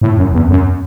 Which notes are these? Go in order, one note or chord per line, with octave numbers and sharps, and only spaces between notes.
A2
F#2
E2
F#2